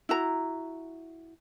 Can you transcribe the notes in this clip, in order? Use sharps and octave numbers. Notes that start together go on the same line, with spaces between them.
E4 F#4 A#5